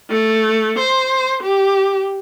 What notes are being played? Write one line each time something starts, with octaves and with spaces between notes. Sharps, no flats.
A3
C5
G4